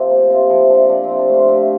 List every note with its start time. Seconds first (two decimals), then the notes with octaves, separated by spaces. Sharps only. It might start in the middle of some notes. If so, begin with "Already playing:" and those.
Already playing: C3 F3 G4
0.11 A#3
0.30 C3 F4
0.50 F3 E4
0.69 C3 D4
0.89 F3 D4
1.04 C3 C4
1.19 D4
1.29 A3 F4
1.48 C3 G4